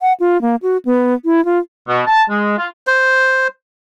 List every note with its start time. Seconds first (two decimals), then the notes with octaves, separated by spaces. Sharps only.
0.02 F#5
0.20 F4
0.42 A#3
0.62 F#4
0.85 B3
1.25 E4
1.45 F4
1.88 B2
2.07 A5
2.30 G#3
2.57 F4
2.87 C5